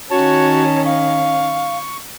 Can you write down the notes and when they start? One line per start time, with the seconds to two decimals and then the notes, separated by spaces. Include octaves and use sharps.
0.11 D#3 C#4 F#4 C#5 A5
0.85 F5 C#6